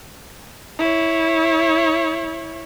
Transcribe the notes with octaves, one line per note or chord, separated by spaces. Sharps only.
E4 C#5